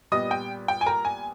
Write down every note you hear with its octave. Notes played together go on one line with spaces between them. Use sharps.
A#2 G3 B3 D#5 D#6
G5
G5
G#5
A#4 A#5
G#5